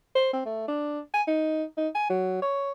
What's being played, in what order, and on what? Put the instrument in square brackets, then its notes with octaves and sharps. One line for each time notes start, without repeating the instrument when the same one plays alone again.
[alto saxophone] C5
C4
A3
D4
G#5
D#4
D#4
G#5
F#3
C#5